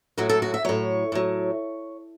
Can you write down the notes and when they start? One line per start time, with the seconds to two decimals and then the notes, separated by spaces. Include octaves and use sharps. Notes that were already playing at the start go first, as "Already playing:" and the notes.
0.18 A2 F#3 F#4
0.29 A4
0.42 F#4
0.54 E5
0.65 A2 F#3 C#5
1.12 A2 F#3